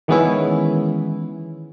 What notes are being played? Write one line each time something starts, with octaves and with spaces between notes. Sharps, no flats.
D#3 E3 G#3 B3 C#4 E4